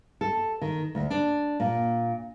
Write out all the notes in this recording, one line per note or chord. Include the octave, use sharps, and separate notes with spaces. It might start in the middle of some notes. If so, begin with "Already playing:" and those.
A4
D#3
D2
D4
A#2